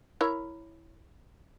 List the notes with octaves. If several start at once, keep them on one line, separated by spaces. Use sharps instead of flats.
E4 A#4 C#5